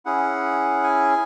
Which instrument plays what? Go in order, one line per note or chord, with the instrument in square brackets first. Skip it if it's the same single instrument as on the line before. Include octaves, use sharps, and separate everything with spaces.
[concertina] C#4 E4 G#4 F#5
G#5